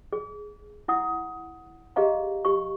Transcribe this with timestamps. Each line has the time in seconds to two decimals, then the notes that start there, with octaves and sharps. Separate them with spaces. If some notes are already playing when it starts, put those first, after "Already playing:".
0.13 G#4
0.88 E4 F#5 D#6
1.96 G4 G#4 D#5 F5 A#5
2.45 G4 C#6